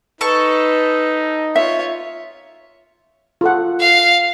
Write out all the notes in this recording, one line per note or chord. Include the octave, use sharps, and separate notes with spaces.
D#4 A4 B4 C#6
F4 C#5 E5
F4 A4 F#5
F5